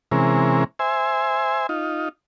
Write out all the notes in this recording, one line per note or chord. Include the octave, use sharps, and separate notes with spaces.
C3 E3 G#3 C#4 A#4
C5 E5 G#5
D#4 F4